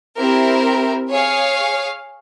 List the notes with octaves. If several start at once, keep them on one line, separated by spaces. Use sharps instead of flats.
C4 E4 G4 A#4
G#4 C#5 F5